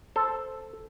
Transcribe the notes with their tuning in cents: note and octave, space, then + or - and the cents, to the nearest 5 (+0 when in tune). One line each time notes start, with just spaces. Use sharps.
A4 +0 C5 +0